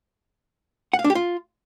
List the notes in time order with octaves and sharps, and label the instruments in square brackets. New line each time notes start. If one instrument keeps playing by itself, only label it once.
[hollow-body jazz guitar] F#5
F5
D4
G4
F4